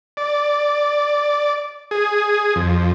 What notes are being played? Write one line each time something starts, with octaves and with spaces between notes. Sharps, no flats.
D5
G#4
F2